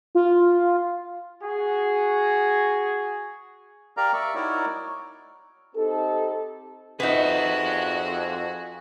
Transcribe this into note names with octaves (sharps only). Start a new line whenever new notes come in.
F4
F#4 G#4
G4 A#4 D5 F5 A#5
D5 E5 C#6
D#4 E4 F#4 A#4 C#5 D5
C4 D#4 G4 A4
F2 D#4 F#4 G#4 B4 E5